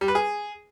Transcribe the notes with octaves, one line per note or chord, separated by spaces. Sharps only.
G3
B4
G#4